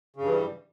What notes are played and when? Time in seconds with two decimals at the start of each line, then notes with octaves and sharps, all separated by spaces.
0.16 C#3
0.21 G2
0.26 E3
0.31 G3